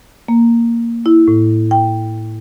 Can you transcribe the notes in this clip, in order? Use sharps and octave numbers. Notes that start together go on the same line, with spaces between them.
A#3
E4
A2
G5